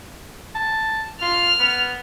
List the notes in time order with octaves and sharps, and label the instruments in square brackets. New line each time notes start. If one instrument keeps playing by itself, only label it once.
[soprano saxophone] A5
[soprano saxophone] F4 [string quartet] F6
[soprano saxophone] B3